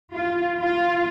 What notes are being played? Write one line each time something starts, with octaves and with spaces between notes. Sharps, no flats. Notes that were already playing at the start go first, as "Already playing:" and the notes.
F4
F4